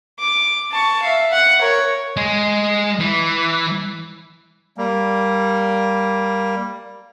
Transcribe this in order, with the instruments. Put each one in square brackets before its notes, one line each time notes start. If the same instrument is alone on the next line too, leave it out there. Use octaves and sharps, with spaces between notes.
[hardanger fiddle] D6
A5 C#6
E5 F5
F#5
A#4 C#5
[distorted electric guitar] G#3
E3
[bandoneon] G3 A#3